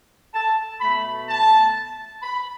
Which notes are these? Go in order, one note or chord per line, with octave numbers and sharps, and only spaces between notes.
A5
B2 A3 B5
A5
B5